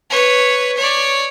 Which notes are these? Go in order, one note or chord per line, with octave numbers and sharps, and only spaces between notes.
B4 C#5
C#5 D5